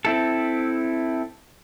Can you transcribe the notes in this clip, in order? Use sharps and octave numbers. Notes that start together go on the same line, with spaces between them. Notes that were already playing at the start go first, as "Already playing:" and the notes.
C4 E4 A4